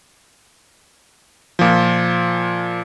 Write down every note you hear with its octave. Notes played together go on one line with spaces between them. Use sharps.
A#2 F3